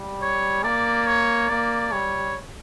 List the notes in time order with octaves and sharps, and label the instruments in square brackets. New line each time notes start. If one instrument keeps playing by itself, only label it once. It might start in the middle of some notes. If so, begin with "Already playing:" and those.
Already playing: [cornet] G3
[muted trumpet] C#5
[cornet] A#3 [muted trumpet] D5
[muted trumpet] C#5
[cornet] A#3 [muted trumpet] D5
[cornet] G3 [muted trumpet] C#5